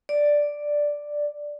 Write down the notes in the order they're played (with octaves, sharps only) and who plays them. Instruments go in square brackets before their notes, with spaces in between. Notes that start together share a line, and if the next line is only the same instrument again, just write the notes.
[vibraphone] D5